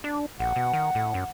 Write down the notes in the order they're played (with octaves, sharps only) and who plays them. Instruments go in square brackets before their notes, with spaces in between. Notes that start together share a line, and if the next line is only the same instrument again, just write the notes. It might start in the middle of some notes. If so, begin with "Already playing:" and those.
[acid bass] D4
[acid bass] A#1 [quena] F#5
[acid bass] B2
D#3
A2
F#2